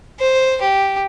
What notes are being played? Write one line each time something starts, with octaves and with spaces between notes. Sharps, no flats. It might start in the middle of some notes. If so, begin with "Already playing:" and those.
C5
G4